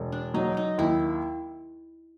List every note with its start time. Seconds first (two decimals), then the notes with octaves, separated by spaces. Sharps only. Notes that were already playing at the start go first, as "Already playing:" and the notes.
Already playing: E1
0.12 D4
0.34 F#3 D#4
0.57 D#4
0.78 D#2 E4